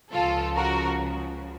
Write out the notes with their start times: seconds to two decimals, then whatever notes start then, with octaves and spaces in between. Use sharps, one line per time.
0.11 C#2 C#3 F3 F4 A4
0.55 F#4 A#4